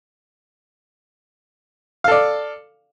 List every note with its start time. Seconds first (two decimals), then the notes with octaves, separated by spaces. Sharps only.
2.04 F5
2.08 A4
2.11 D5